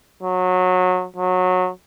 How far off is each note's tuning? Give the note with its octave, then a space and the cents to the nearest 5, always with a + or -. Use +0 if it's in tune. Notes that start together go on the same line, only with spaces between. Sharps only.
F#3 -20
F#3 -20